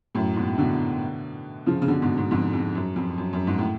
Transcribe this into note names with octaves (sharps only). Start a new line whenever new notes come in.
F#2 A2
G#2 B2
B2 D3
C#3 F3
C#3
B2 D3
G#2 B2
G#2 B2
F2 G#2
F2
F#2
F2
F#2
F#2
G#2
A2